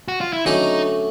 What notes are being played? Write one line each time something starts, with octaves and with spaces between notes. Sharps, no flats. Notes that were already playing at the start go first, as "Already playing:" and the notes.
F#4
F4
E4
D3 F#3 A3 C#4 D#4 F#4